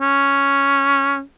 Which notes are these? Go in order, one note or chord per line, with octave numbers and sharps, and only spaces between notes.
C#4